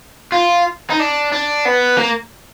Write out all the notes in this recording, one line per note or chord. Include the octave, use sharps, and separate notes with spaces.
F4
D#4
D4
D4
B3
A#3